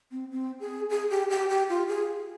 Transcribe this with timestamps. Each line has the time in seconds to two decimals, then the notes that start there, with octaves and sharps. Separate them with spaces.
0.11 C4
0.31 C4
0.60 G#4
0.90 G#4
1.10 G4
1.30 G4
1.50 G4
1.69 F4
1.88 G#4